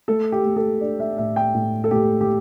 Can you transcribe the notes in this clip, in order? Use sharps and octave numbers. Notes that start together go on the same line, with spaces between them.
A3 A4
G4
A3
A4
D4 D5
E5
A2 E5
G5
A2
A4
A2 G4
G4